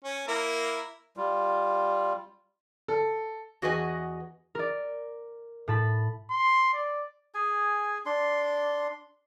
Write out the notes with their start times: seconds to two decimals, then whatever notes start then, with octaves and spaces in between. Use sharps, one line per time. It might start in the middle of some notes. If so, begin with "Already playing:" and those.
0.04 C#4
0.28 A#3 E4 A#4
1.17 G3 F4
2.88 A4
3.62 E2 F#4 G#4 B4 D#5 G#5
4.55 A#4 D5
5.68 A2 A5 B5
6.31 C6
6.73 D5
7.35 G#4 G#5
8.06 D4 C6